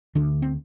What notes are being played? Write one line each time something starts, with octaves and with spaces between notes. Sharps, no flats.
D2 D3 D4
C4